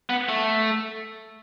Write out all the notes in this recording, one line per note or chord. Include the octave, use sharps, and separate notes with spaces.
B3
A3